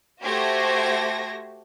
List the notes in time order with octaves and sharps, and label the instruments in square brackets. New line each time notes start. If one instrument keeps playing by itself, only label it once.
[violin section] A3 F#4 G4 C5 G#6 A#6